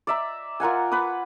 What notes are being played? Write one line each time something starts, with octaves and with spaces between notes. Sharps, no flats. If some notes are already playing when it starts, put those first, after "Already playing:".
D5 E5 A#5
F4 A#4 F#5 G#5
B4 D6 D#6